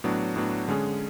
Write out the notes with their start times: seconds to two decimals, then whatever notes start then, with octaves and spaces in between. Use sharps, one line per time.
0.04 A2 F#3 B3 D4
0.36 A2 F#3 B3 D4
0.68 D3 G#3 C#4 G#4